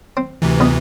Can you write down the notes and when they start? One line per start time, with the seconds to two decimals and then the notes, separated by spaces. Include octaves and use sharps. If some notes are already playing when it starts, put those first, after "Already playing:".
0.17 C4
0.42 D2 C3 E3
0.60 A#1 B3 D#5